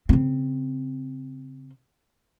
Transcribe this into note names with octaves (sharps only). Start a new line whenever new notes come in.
C#3 C4